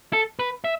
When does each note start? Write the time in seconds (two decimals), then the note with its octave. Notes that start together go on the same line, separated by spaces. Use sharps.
0.13 A4
0.39 B4
0.64 E5